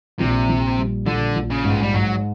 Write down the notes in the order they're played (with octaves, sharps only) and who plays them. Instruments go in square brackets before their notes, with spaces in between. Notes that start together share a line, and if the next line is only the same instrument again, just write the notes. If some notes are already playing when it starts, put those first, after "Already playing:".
[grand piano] A#1 [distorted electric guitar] C3
[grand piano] A#1
G3
[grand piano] A#1 [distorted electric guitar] D3
[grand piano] A#1
[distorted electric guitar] C#3
[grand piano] G#2
[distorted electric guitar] G#3
G3
[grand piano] G#2 [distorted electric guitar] F#3